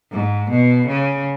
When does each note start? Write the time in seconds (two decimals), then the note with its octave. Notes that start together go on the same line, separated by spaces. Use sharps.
0.12 G#2
0.50 B2
0.88 C#3